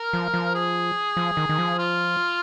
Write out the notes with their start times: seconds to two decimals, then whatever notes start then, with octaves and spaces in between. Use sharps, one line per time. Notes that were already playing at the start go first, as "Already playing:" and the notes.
Already playing: A#4
0.13 F3
0.34 F3
0.55 G#4
1.17 F3
1.37 D#3
1.49 D#3
1.58 F3
1.78 F4